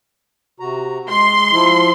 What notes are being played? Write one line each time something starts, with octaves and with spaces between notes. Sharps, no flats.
C3 F#4 A#5
G#3 C6
F3 E4